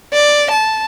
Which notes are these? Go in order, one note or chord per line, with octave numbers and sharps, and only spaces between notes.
D5
A5